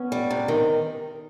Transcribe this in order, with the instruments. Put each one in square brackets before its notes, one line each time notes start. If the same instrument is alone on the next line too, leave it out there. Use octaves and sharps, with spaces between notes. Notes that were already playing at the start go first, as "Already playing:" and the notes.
Already playing: [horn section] B3 C#4
[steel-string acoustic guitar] G3
C3
D#3